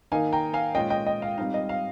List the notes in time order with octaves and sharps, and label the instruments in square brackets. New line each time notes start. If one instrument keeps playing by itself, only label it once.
[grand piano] D#3 A#3 D#4 F5 G#5
G5 A#5
F5 G#5
A#2 G#3 C#4 F4 D#5 G5
D#5 G5
D#5 G5
F5
G3 C4 D#4 F5
D#5
F5